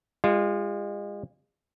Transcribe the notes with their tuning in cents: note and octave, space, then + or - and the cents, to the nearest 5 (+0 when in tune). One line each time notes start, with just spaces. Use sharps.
G#3 -40 F4 -10